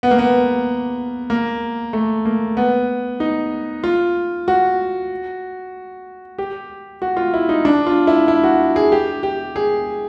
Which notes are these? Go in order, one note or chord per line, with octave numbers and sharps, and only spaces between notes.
B3
A#3
B3
A#3
A3
A#3
B3
D#4
F4
F#4
G4
F#4
F4
E4
D#4
D4
F4
E4
E4
F#4
G#4
G4
G4
G#4